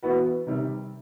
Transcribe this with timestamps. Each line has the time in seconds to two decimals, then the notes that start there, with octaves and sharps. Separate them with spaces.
0.03 E3 B3 F#4 B4
0.47 C3 D#3 G3